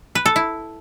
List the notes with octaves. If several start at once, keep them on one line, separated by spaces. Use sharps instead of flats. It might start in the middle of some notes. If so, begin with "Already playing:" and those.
B4
A4
E4